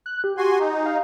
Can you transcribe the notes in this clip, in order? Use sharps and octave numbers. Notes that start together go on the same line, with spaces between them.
F#6
G4
F#4 G#5 C6
D#4
F5